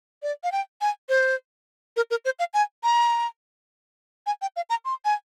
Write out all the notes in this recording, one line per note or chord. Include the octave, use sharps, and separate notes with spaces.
D5
F5
G5
G#5
C5
A#4
A#4
C5
F5
G#5
A#5
G#5
G5
F5
A#5
C6
G#5